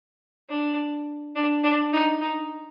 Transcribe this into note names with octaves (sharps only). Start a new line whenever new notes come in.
D4
D4
D4
D#4
D#4